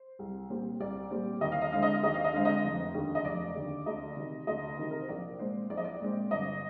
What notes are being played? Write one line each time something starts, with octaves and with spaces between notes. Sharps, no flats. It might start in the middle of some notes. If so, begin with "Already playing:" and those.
Already playing: C5
C2
A#2 G3 C4
C2 D5
A#2 G3 C4
D#2 D#5
F5
D#5
D3 G#3 C4 F5
D#5
F5
D#2 D#5
F5
D#5
D3 G#3 C4 F5
D#5
F1
D#2 D3
D#5
F1 D5
D#2 D3
D2 D#5
C3 D#3
D2 D#5
C3 D#3
A#4
C5
A#1 D5
A#2 G#3 C4 C5
A#1 D5
D#5
D5
A#2 G#3 C4
G1 D#5